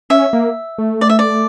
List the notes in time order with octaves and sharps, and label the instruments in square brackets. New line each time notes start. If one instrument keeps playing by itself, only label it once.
[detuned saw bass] C#4 [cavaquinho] E5
[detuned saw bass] A#3
A3
[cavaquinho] D5
E5
D5